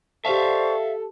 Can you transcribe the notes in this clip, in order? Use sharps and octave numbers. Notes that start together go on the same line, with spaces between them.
G4 A4 C5 D5 E5 F5 A5 C#6